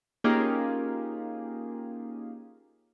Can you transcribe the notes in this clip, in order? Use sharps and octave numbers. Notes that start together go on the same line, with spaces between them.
A#3 C#4 D#4 F4 G4 G#4